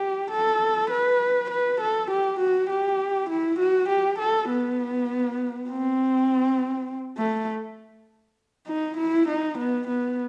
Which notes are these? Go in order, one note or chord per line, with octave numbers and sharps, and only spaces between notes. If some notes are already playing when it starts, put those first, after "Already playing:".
Already playing: G4
A4
B4
B4
A4
G4
F#4
G4
E4
F#4
G4
A4
B3
C4
A3
D#4
E4
D#4
B3
B3